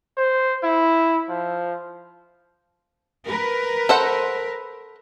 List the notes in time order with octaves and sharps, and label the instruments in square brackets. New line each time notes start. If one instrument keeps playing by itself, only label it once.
[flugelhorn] C5
E4
F3
[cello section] A#4 B4
[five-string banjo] A4 C5 F#5